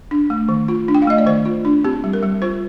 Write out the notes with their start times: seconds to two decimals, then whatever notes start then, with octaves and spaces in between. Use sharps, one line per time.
0.11 D4
0.30 A3
0.49 D#3
0.68 F4
0.88 D4
0.95 G5
1.02 F5
1.07 A3 D#5
1.18 D5
1.26 D#3 C5
1.45 F4
1.65 D4
1.84 C4 G4
2.04 G3
2.13 A#4
2.23 G3
2.42 F4 C5